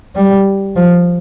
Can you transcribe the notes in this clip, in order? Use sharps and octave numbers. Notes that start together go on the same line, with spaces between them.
G3
F3